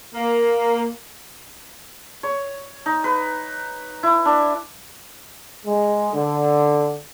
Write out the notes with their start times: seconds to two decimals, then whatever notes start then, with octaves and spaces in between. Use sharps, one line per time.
0.13 A#3
2.23 C#5
2.86 D#4
3.04 B4
4.03 E4
4.25 D4
5.65 G#3
6.13 D3